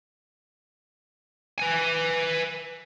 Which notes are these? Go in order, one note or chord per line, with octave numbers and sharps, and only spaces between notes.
B4 G#5